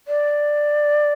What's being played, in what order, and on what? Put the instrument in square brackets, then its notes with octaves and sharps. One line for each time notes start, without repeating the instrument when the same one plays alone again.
[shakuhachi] D5